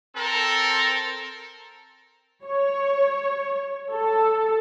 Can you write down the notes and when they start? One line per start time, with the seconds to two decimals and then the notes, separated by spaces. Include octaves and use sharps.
0.16 C4 A4 A#4
2.46 C#5
3.93 A4